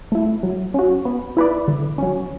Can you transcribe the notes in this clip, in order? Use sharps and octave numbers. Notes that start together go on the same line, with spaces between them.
A3 E4
F#3
C#4 F#4
B3
E4 B4 D5
D3
F#3 C#4